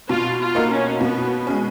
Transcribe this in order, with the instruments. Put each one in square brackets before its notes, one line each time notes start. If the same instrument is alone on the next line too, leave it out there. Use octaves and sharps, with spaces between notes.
[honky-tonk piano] B2 [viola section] F4
[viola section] F4
[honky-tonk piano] A#3 D#4 F#4 A#4
[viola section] C#4
[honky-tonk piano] B2 [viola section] B3
[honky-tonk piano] G#3 C#4